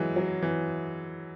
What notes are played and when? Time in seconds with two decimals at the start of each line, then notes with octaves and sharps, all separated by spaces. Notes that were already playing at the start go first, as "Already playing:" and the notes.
Already playing: E3 F#3 G#3
0.16 F#3
0.42 E3